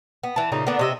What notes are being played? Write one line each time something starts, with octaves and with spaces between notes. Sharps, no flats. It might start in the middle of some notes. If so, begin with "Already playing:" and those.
B3
E3 A5
A#2 C#3 D#4
D3 A#3 B3 D4
C3 D#5 E5